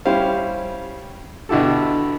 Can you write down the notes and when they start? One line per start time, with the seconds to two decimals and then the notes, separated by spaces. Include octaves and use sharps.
0.05 G3 C#4 E4 G4 C5 F5
1.49 B2 D3 E4 G4 A4